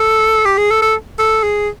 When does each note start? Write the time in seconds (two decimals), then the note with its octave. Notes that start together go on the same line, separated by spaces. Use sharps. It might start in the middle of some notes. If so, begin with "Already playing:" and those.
Already playing: A4
0.45 G4
0.57 G#4
0.70 A4
0.82 A4
1.19 A4
1.43 G#4